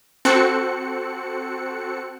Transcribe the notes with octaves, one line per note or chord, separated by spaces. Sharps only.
C4 F#4 A4 F#6 C#7